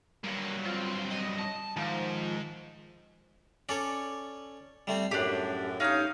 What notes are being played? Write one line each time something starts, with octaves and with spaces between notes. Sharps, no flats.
G2 F#3 A#3
C4 F4
D#5
A5
G#2 D#3 F3
C#4 A4 C#5 D5
G3 A3 C4
F#2 A2 D4 G4
G2 C#4 D#4 F5 G6